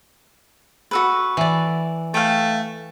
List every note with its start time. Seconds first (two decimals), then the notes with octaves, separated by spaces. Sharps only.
0.91 F#4 A4 B4
1.37 E3 D5
2.14 A3 F5 G5